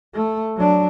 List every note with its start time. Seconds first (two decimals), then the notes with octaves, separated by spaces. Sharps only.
0.14 A3
0.56 F#3 D4